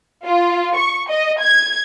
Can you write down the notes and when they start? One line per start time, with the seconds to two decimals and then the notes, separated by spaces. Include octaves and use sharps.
0.25 F4
0.77 C#6
1.10 D#5
1.40 G#6